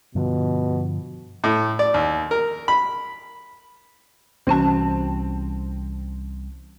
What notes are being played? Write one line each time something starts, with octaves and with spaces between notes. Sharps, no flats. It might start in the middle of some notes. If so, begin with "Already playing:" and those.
G2 B2 D3 F3
A2
D5
D#2
A#4
B5
C2 E3 C4 C#4 F#4 A5